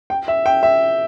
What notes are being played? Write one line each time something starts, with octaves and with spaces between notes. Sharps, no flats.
G5
E5
G5
E5